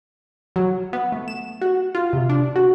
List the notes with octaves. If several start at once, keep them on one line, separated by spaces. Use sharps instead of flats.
F#3
B3
A3
E7
F#4
F4
C3
D4
F#4